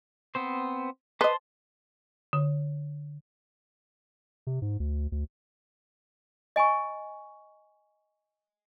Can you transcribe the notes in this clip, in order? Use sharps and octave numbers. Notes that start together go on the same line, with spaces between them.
B3 C4 C5
B4 C5 D#5 A5 C6
D3
C3
G#2
D2
D2
D#5 G#5 B5 C#6